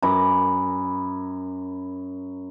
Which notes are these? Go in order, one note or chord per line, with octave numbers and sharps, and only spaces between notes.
F#2 A#5 B5 D6